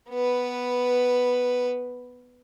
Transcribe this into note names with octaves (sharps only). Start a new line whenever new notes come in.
B3 B4